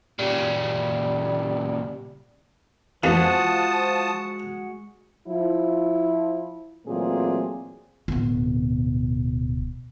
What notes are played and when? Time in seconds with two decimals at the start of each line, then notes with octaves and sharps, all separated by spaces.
0.19 A#2 C#3 G3
3.03 F2 E3 F3 G#3 A#3 F#4 A5 D#6
5.28 F3 E4
6.86 A#2 E3 F#3 A3 C4 G#4
8.08 D1 B2